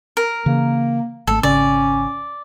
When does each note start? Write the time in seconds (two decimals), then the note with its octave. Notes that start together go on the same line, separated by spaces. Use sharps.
0.17 A#4
0.46 C#3 E3 A#3
1.27 G#1 A3 A4
1.43 G#1 C#3 C#4 D5